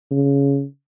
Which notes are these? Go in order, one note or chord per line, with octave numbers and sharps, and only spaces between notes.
C#3